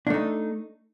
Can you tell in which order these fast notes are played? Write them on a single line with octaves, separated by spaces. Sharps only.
D4 A3 D#4